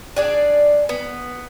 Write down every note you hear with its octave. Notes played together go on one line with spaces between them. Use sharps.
D4 G#4 D5
B3